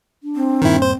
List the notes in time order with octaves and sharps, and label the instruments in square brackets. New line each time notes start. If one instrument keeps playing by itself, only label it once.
[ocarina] D4
[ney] C4
[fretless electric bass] D#1 G2 A#3 [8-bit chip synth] D#3 E4
[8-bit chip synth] C5